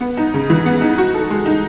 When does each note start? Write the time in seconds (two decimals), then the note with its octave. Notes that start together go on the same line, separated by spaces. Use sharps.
0.01 B3
0.17 D#4
0.34 C#3
0.50 E3
0.66 B3
0.82 D#4
0.98 F#4
1.14 A4
1.30 G#3
1.46 D#4